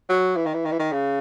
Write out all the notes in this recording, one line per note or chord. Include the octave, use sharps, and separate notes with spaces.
F#3
E3
D#3
E3
D#3
E3
D#3
C#3